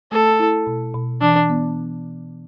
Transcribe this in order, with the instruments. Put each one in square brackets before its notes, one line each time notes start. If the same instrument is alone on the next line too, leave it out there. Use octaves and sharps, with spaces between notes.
[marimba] A3 [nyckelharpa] A4
[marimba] E4
B2
B2
[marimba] E3 [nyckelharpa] D4
[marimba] B3